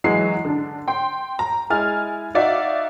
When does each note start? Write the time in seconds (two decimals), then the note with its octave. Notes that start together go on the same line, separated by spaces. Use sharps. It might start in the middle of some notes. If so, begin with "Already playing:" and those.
0.04 E3 F#3 G#3 C7
0.45 D3 D4
0.88 G5 C6
1.39 A#5
1.70 G#3 E4 G#5 F6 A6
2.35 D#4 F#4 D5 E5 F5